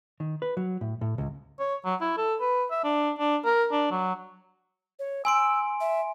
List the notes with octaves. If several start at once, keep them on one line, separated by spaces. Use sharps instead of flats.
D#3
B4
F#3
A2
A2
C#2
C#5
F#3
E4
A4
B4
E5
D4
D4
A#4
D4
F#3
C#5
G#5 C6 E6 D7
E5